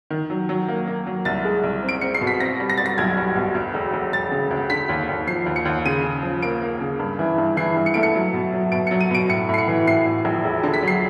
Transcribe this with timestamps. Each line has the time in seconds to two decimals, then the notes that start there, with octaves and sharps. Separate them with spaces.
0.10 D#3
0.30 F#3
0.49 F#3
0.68 A#3
0.87 A#3
1.07 F#3
1.25 C2 A6
1.45 G#3
1.63 C2
1.83 C4
1.89 D7
2.01 C4 C#7
2.15 C7
2.21 B2
2.27 B6
2.40 C4 A#6
2.60 G3
2.70 A#6
2.77 G3 A6
2.86 A#6
2.98 B1 G#6
3.17 G3
3.36 B2
3.55 D2
3.74 E1
3.93 E1
4.12 E1 A6
4.31 C#3
4.51 D2
4.70 D3 B6
4.89 D#2
5.09 D#2
5.27 F3 C7
5.46 D#2
5.56 C#7
5.65 D#2
5.85 C#3 D#7
6.04 C#3
6.23 F3
6.42 A#3 D7
6.62 A#3
6.81 C#3
6.99 G2
7.19 E3
7.38 G2
7.57 E3 C7
7.77 G2
7.86 C#7
7.94 A3 D7
8.03 C#7
8.15 F#3
8.33 B2
8.53 F#3
8.72 B2 D7
8.87 F#3 C#7
9.01 D#7
9.11 B2 D7
9.29 A2 C#7
9.49 A2
9.54 C7
9.58 C#7
9.68 E3
9.87 A2 C7
10.06 A2
10.25 A#1
10.44 E1
10.63 D3
10.74 B6
10.83 F#3 C7